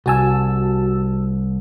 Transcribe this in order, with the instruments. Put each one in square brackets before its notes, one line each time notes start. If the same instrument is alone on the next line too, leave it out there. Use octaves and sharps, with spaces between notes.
[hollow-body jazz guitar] C2 G#5 [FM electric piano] F#4 A5 E6